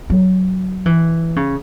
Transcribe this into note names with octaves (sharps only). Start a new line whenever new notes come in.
F#3
E3
C#3